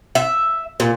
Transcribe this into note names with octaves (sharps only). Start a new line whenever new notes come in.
E5
A#2